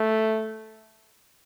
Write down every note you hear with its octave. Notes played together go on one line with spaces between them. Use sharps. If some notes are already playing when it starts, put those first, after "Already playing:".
Already playing: A3